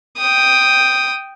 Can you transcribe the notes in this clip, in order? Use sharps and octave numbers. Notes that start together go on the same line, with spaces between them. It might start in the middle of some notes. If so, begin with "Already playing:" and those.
G5 D#6